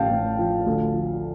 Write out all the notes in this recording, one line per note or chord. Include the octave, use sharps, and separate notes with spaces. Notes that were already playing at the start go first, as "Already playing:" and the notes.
Already playing: A1 A2 F3 F5 G5 A5
A1
F3
D2
F3